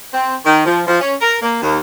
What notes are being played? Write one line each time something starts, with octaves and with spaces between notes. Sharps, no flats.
C4
D#3
F3
F3
C#4
A#4
A#3
D#2